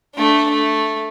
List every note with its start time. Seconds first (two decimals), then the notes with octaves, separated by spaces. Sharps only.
0.14 A3 D4
0.50 A3